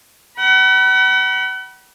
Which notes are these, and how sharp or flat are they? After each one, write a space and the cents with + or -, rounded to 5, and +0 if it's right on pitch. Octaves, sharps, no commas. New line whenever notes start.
F#5 +35 B5 -35